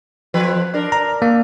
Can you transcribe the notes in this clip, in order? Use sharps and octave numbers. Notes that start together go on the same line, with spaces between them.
F2 F3 B4
D4 A#4
A#5
A#3